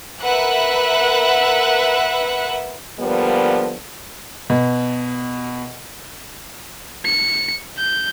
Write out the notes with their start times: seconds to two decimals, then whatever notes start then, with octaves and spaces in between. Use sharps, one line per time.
0.22 A#4 B4 E5 F#5 F#6
3.00 D3 F3 G3 A#3 B3
4.50 B2
7.05 C#7
7.78 G6